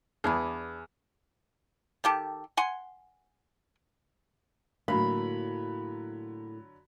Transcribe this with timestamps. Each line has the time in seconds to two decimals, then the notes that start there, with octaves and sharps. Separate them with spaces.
0.24 E2 B3 D4 G#4
2.04 D#3 G4 A4
2.57 F#5 G#5 C6
4.88 A2 D3 F#3 A#3 B5